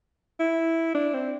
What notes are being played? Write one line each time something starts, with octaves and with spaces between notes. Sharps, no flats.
E4
D4
C4